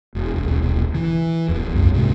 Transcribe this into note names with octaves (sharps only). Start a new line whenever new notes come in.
E1
D#1 B1
E3
D1 E2
C2 F#2 A2
G#2 C3 F#3 G#3